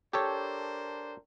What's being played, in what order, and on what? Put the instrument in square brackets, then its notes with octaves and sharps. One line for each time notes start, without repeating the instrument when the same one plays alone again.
[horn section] D4 A#4 C5 [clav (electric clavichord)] G4 A4 C#5